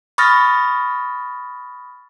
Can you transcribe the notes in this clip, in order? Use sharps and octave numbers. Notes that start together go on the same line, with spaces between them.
B5 C#6 D#6 F6 A6 A#6